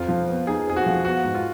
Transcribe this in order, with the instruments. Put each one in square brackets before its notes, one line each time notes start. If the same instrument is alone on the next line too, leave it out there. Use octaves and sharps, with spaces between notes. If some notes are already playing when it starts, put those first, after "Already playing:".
Already playing: [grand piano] F2 [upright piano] F4
[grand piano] F3
B3
[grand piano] D#4 [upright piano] G#4
[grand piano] F2 [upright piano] G#4
[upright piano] F#4
[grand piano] F3
[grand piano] B3 [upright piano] F#4
[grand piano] G#2
[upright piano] F4